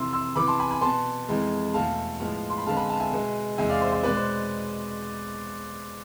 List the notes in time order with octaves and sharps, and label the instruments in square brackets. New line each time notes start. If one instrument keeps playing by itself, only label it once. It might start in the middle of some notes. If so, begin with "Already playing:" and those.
Already playing: [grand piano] F2 C3 E3 C6 E6
C6 E6
C3 E3 B3 B5 D6
A5 C6
G#5 B5
G#5 B5
B2 B3 A5 C6
F2 E3 G#3
E2 B2 A3 F5 A5
A2 F3 G#3 B3
C6
B5
F2 D3 G#3 B3 F5 A5
G#5 B5
F5 A5
E5 G#5
B2 G#3 B3
E2 C3 G#3 E5 G#5
D5 F5
C5 E5
C5 E5
B2 G#3 B3 B4 D5
C5